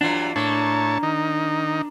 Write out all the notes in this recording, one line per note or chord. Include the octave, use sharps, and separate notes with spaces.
G2 E3 F#3 D4 F4
A2 A#3 D4 C#5 A5
D#3 D#4